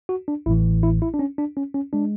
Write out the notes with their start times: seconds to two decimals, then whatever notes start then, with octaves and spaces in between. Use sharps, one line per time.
0.09 F#4
0.28 D4
0.46 A1 E4
0.49 A2 E3
0.83 E4
1.02 E4
1.14 D4
1.19 C#4
1.38 D4
1.57 C#4
1.74 C#4
1.93 G#3 D4